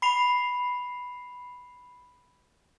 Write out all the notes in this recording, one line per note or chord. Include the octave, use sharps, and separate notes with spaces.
B5 C7 F7